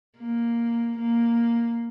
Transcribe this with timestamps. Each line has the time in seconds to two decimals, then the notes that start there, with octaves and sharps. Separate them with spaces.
0.18 A#3
0.97 A#3